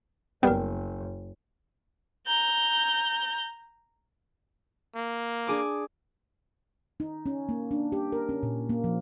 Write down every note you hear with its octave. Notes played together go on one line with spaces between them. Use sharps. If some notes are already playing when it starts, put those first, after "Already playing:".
F#1 G3 B3 A#4 G5
A#5 G6
A#3
D4 G#4 D6
D#4
C#4
A#3
D4
G4
A#4
C#4
A#2
A#3
F3